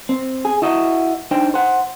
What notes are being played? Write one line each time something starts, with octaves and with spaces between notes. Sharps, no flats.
C4
G#4
E4 F#4 D#5
D4 D#4 C5 G5
C5 F#5